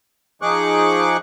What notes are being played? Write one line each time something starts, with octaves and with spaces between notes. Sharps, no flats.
F3 D#4 G#4 C#6 D6 F#6